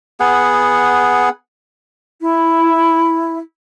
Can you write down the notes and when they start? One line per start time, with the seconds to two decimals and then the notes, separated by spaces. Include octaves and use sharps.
0.20 B3 G#4 F#5
2.20 E4